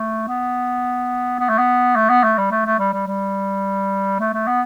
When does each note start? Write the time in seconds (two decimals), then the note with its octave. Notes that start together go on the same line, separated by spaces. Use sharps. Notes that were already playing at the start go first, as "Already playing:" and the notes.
Already playing: A3
0.27 B3
1.39 B3
1.49 A3
1.58 B3
1.95 A3
2.09 B3
2.23 A3
2.37 G3
2.51 A3
2.66 A3
2.79 G3
2.93 G3
3.07 G3
4.20 A3
4.33 A3
4.47 B3